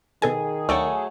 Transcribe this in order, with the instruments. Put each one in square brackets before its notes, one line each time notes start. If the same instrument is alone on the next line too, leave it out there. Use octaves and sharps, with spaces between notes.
[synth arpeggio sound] B2 A4 G#5 [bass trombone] D#3 [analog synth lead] G#4
[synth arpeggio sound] D2 D5 G5 [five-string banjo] F#3 A3